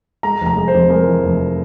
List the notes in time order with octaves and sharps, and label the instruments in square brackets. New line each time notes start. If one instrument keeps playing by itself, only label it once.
[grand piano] G#3 A#5
F1
A#5
G#3
C5
F2
G#3 A#4
E3
F1